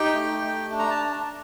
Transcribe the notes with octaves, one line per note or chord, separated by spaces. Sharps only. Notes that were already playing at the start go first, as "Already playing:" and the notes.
Already playing: D#4 G4 G5
A3
A3
D4
A#5
A5